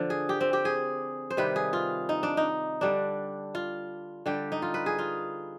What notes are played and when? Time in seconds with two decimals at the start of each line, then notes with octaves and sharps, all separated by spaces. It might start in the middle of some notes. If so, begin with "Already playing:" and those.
Already playing: D3 F3
0.10 G#4
0.29 G4
0.41 C4
0.53 G4
0.65 G#4
1.30 C5
1.37 C3 D#3 G3 B4
1.56 G#4
1.73 F4
2.09 D#4
2.23 D4
2.37 D#4
2.81 D3 G3 D4
3.55 F4
4.26 D3 G3 G4
4.52 D#4
4.62 F4
4.74 B4
4.86 G#4
4.99 F4